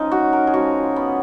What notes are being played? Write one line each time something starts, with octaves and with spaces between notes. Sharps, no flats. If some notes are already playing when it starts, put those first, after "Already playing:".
Already playing: C#3 F3 G#3 C#4 D#4
F#4
A#4
G#4
C#3 F3 G#3 F#4
B3